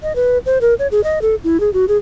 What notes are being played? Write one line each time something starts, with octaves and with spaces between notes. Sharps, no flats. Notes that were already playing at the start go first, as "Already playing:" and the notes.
D#5
B4
C5
A#4
C#5
G#4
D#5
A4
E4
G#4
F#4
G#4